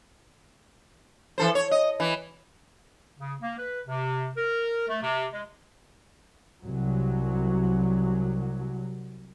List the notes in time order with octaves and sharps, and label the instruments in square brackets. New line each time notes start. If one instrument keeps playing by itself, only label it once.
[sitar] E3 A4 C5
C#5
D#5
E3
[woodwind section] C#3
A#3
B4
C3
A#4
A3
C3
G#3
[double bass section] C2 F#3